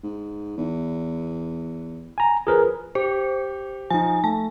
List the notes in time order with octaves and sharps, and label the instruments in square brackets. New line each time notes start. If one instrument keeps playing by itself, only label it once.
[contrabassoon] G#2
E2
[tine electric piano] G#5 A#5
[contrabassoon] F3 [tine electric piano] G#4 A#4 B4
[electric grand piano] G4 [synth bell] C5
[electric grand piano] F3 D#4 [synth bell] G#5
[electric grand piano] A3 [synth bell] A5